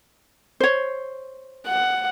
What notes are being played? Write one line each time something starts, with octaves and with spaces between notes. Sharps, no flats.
C5 C#5
F#5